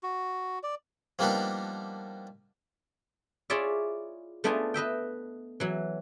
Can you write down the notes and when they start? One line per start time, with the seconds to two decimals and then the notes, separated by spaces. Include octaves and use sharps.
0.03 F#4
0.63 D5
1.19 F3 G3 A#3 B3 D4 D#4
3.50 E4 F4 G#4 C#5 D5 E5
4.44 A3 B3 D4 F4 D#5 G#5
4.74 B4 D#5 E5 G5
5.60 E3 F#3